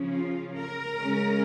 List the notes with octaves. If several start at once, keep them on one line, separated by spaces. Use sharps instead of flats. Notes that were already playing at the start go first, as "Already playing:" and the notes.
Already playing: C#3 F3 C#4
F4
A#4
C#3 G#3 C#4